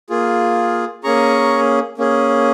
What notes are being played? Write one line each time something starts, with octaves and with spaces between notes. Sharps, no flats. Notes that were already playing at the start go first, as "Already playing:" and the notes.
A#3 F4 G#4
A#3 C#4 G#4 A#5 C#6
A#3 C#4 G#4